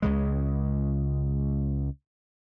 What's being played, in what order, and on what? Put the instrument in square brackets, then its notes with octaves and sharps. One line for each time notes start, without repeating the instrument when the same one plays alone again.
[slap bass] C#2 C#3 G#3